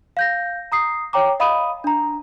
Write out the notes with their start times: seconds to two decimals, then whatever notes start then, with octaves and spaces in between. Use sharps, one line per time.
0.17 F5 G6 A#6
0.72 A#5 D#6 C7
1.13 C#5 G5 A#5 D6
1.40 D#5 F5 B5 D#6 D#7
1.84 D4 A#5